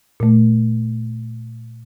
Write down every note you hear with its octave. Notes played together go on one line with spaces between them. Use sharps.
A#2 A3